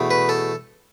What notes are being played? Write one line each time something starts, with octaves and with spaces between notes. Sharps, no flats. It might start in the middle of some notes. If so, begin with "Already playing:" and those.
Already playing: E2 B2 A3
B4
A4